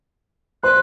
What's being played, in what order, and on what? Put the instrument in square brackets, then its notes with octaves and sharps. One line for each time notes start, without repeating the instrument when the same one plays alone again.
[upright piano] C5 C6 [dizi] F#6